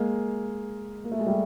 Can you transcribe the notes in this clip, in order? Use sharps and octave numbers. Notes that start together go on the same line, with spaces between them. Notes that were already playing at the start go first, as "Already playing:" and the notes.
Already playing: G#3 A#3
A#3
A3
G#3
G3 A3